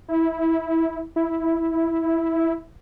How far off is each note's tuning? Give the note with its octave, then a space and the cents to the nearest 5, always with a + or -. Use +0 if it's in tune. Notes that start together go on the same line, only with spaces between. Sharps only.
E4 -15
E4 -5